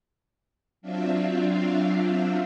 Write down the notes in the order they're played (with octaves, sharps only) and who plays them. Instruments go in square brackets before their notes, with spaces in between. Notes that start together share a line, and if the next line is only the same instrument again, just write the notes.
[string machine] F#3 C4 D4 F4 E5 F5